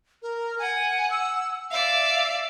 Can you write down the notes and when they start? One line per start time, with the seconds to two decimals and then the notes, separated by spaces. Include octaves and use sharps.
0.22 A#4
0.59 F#5 G#5
1.10 E6
1.71 D5 E5 F5